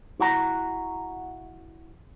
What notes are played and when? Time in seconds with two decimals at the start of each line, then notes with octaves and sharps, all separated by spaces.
0.20 E4 F#4 F#5 A#5